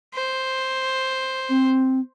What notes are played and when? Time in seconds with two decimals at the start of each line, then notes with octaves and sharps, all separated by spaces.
0.15 C5
1.49 C4